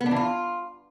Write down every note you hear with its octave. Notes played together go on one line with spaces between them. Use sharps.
B3
D4
E3
F4